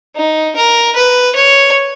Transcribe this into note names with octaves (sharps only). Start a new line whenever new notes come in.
D#4
A#4
B4
C#5